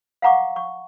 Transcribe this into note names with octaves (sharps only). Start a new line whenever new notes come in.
F5 F#5 A#5 C#6 D6
C#6